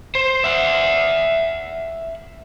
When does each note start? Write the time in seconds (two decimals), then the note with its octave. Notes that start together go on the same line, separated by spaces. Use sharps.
0.15 C5
0.44 E5 F#5